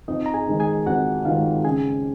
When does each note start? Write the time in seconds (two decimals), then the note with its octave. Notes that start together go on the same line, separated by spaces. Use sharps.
0.08 F2 D#4 D#5
0.26 A#5
0.34 G#4 G#5
0.47 D#3 G#3
0.60 G#4 G#5
0.86 F2 F#4 F#5
1.25 D#3 G#3 F4 F5
1.64 C#3 G#4 G#5